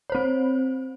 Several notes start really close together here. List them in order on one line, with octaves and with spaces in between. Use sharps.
C#5 C5 C4